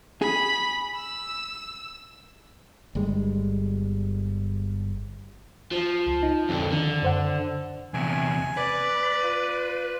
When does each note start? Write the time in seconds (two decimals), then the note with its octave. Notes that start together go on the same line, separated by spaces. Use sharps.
0.22 G#4 B5
0.95 E6
2.95 G1 G3 G#3
5.72 F3
6.07 C#2
6.23 D#4
6.49 F2 D3
6.72 D3 D#3
7.03 F#2 C5 F#5
7.94 E2 C3 G#5
8.57 B4 D5
9.23 F4